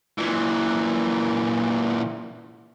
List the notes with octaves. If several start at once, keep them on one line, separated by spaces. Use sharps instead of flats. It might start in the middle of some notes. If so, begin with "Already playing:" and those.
A#2 E3